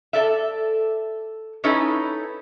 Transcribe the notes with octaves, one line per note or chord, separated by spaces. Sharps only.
A4 D5 E5
C#4 D#4 E4 A4 B4 C#5